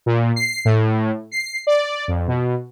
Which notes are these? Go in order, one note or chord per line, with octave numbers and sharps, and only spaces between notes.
A#2
C7
A2
C7
D5
F2
B2